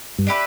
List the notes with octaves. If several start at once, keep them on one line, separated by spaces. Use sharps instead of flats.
G2
D4 G4 B4 E5